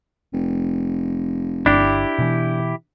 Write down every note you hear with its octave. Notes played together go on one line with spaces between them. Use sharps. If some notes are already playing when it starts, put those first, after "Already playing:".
F1
G1 D4 E4 G4
B2 E3